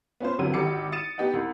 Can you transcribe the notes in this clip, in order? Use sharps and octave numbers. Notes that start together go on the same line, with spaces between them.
B3 C#4 F4 C5
G1 C2 C3 E3 F#3 D#7
G#1 G4 D6 C#7
D#6 A6 C#7 D#7 E7
B3 D#4 G4 D#5 F#5
C2